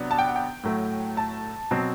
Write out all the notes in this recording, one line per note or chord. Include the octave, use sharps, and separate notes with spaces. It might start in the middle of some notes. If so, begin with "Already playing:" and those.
Already playing: C3 F#3 B3 D4
A5
G5
F#5
G5
A2 F#3 A3
A5
B2 F#3 C4